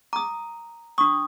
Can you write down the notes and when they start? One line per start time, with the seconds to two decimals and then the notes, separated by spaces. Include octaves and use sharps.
0.13 A#5 D6 D#6
0.98 D4 C#6 D#6